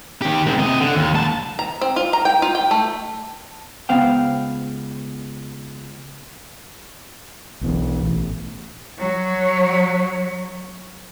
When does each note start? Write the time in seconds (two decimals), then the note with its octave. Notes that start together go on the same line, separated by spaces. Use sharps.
0.22 D#3 G4
0.46 G#3 C4
0.58 C3 D#5
0.80 D3
0.95 D#2
1.14 C#2 A5
1.59 A#5
1.81 C4
1.96 F4
2.13 A#5
2.25 G5
2.42 F4
2.55 G5
2.71 A3
3.89 C#2 B3 C5 F5 G5
7.61 B1 B2 E3
8.00 A1
8.99 F#3 C#5